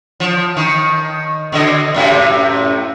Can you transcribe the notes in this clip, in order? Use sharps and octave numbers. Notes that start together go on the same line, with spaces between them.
F3
D#3
B2 D3 D#5
F#2 A2 C3